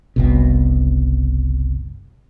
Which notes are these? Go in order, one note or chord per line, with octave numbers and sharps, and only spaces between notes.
F#1 C2 B2